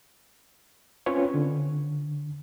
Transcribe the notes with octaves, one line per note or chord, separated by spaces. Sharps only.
C4 C#4 F4 B4 C#5
D3